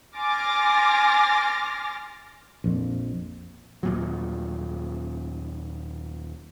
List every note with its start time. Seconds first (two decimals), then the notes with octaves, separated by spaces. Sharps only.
0.15 G#5 C6 D6 F6 A6 A#6
2.64 A#1 F2
3.83 D#2 A#2 F#3